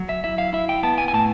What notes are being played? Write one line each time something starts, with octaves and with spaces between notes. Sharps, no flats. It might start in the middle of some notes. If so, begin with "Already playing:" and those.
Already playing: F#3
E5
E4 E5
F5
E4 E5
G5
B3 A5
G#5
G#5
A2 A5